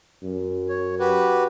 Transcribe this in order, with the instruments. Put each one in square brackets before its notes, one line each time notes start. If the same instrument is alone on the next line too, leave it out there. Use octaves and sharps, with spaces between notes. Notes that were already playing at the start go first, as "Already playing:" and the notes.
[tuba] F#2
[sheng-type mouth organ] C#5
F#4 G4 B4